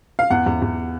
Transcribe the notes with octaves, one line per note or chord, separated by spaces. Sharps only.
F5
E2 F#5
E2
E2